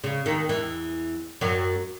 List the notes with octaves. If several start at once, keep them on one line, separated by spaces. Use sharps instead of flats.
C#3
D#2 D#3
E2 E3
F#2 F#3